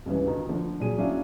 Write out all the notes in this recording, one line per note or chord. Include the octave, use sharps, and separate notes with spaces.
C#2 G2 C#3 E3
D2 D#3
D3 F3 A3
A#2 F#3 G#4 D#7
F#3 C#4 D4 E4 F4 F5